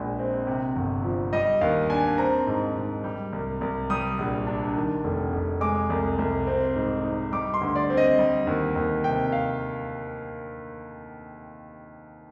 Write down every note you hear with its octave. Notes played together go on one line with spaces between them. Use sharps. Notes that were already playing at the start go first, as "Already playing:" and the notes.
Already playing: A#1 G#3
C4
C3
G1
F3
G3 D#5
D#2 F5
D4 G#5
C4 A#5
G#2
G#2
G3
C2
C2
G3 D#6
A#1
D4
D#3
F1
F1
G#3 D6
C2
C2
C4
G#2
D#4
G3 D6
C6
D2
D5
C4
D#5
G3
D#2
D#2
C3 G5
F5